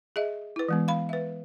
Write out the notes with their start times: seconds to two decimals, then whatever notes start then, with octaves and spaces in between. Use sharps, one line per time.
0.16 G#4 D#5 E5
0.56 E4 B4
0.68 E3 G#3 B3
0.88 F5 B5
1.09 B4 E5